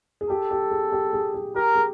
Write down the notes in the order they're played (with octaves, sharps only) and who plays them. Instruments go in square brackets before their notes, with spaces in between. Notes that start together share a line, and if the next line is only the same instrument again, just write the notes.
[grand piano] G#4
[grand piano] G4 [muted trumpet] A4
[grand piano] G4
G#4
G4
G#4
G#4
[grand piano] G4 [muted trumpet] A#4
[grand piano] G#4